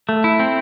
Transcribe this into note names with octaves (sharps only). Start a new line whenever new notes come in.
A3
E4
C4